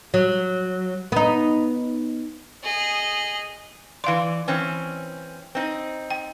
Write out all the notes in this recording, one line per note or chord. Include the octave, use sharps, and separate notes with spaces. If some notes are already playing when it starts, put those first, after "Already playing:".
F#3
B3 D#4
G#4 D#5
E3 D5 F5 C6
E3 C4 C#4
C4 D#4
G5